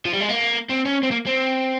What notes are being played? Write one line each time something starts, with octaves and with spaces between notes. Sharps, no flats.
F3
G3
G#3
A#3
C4
C#4
C4
A#3
C4